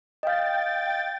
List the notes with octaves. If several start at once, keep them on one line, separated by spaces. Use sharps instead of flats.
D#5 F5 G5 A6